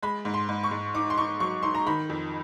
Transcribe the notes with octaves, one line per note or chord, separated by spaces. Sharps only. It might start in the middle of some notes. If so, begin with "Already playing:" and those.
G#3 B5
G#2
C6
G#2
C#6
G#2
D#4 D6
C6
D#4 C#6
F#3 C#6
D#4 C6
A#5
D#3 B5
F2